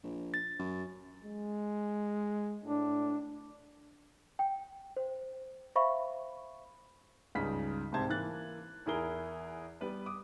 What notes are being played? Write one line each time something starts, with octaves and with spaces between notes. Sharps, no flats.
A#1
A6
F#2
G#3
A2 D4
G5
C5
C5 E5 F5 B5 C#6
C#2 G2 C#3 D#4 B6
C2 G#2 C3 C5 A5 G#6
E3 A#3 F#6 A6
E2 E4 G#4 A#4 G7
G3 B3 B4 D5
D6 D#6